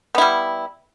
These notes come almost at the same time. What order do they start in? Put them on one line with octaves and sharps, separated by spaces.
B3 E4 G3